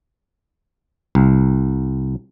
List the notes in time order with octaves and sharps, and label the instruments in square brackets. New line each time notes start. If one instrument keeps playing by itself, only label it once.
[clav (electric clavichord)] C2